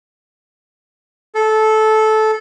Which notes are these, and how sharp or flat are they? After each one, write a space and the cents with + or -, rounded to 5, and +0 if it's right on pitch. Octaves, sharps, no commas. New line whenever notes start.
A4 -15